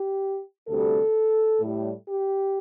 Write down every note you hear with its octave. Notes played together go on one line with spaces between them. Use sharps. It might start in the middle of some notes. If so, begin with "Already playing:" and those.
Already playing: G4
D2 C3 G3 A4
A2 G3
G4